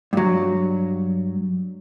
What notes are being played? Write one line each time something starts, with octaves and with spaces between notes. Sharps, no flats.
G2 F#3